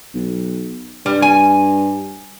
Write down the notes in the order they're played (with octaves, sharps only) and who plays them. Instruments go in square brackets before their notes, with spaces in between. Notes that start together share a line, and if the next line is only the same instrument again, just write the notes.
[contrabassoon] B1
[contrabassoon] G2 [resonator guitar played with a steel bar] G3
[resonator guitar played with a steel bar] G#5